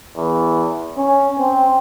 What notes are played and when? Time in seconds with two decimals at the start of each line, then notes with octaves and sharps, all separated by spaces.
0.16 E2
0.97 C#4
1.39 C4